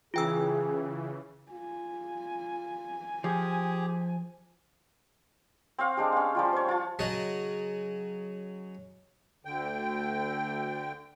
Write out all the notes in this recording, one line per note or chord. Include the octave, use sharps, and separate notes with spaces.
C#3 E3 F4 G#4 G5 E6
F4 G#5
F3 G4 G#4
C4 C#5 F5 F#5
G#3 D4 G4
C#4 F5
F3 G3 F4
C5 C#5
F4 A5
C#3 F#3 D#5 A5
D2 D3 G5